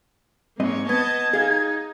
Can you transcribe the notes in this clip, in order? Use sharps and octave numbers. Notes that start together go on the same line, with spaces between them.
G#2 A#3 C4 C#5 D#5
B3 D#5 A5 G#6
D#4 G#4 F5